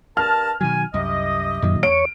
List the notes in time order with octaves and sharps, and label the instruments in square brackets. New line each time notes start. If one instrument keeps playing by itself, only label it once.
[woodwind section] G2 A#4 A5 [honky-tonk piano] F6
[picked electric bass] B2 D#3 F#3 [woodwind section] G#5
[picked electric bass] C2 F#2 [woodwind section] E4 G4 D#5
[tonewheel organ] F#2 [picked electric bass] A#2 D#3 F#3
[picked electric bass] E2 [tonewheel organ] C#5 [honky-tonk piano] D7